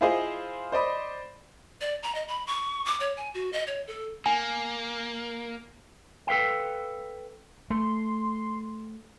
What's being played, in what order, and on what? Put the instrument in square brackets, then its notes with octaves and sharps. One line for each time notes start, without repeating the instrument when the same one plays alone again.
[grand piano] E4 F4 G#4 C5 D#5 F5
C5 D5 D#5 B5
[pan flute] D5
A#5
D#5
B5
C#6
D6
C#5
G#5
F#4
D#5
C#5
A4
[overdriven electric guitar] A#3 [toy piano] G#5
[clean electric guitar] A4 B4 F5 G5
[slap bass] A3 [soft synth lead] C6